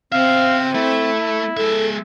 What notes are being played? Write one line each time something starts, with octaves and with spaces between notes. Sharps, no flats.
C4 C5 E5 F5
A3 E4
G#3 A4 E5